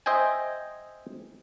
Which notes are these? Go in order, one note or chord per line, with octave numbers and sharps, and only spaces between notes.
C5 D#5 E5 G5 G#5